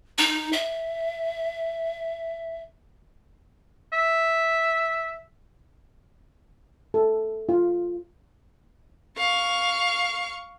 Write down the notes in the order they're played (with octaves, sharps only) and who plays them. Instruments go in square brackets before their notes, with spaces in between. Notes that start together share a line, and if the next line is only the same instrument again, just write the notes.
[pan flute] D#4
E5
[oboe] E5
[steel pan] A4
F4
[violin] F5 C#6